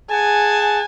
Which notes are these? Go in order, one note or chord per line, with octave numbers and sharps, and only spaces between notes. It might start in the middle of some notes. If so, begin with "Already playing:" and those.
G#4 F#5 G#5 A5